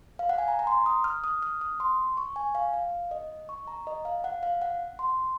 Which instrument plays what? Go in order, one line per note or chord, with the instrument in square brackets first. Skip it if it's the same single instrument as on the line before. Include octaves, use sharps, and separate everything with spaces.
[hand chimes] F5
F#5
G#5
A#5
A#5
C6
D#6
F6
D#6
F6
D#6
C6
C#6
G#5
F5
F5
D#5
C#6
A#5
D#5
F5
F#5
F5
F#5
C6